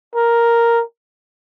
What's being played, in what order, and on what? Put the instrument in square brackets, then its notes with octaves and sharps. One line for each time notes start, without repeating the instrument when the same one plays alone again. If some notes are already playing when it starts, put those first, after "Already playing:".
[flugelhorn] A#4